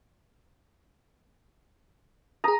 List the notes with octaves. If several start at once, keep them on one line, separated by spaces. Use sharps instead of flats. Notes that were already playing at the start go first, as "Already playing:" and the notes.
G#4 A#5 D#6